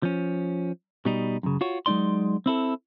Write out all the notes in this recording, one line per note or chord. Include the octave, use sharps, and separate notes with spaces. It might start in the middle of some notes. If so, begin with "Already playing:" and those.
F3 C#4
B2 G3 D#4
F#2 C#3
F4 F#4 C#5
F#3 G#3 C#4 D#4 D5 C6
C4 E4 A4